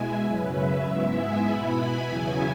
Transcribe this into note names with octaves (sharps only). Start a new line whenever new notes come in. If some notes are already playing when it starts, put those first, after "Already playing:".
Already playing: B2 G#3 E4 E5 G#5
F#2 C#3 F#3 C#4 B4
E5
G#2 G#3 B3 E4
G#5
B2 B3 E4 B5
G#5
E2 C#3 F#3 B3 E4